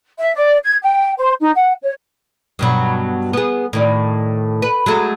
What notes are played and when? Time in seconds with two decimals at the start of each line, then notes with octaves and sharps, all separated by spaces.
0.19 E5
0.34 D5
0.63 G#6
0.81 G5
1.17 C5
1.40 D#4
1.54 F#5
1.82 C#5
2.59 G2 B2 F#3
3.33 B3 G#4
3.73 A2 D#3 D5
4.62 B4
4.86 F#3 G#3 A3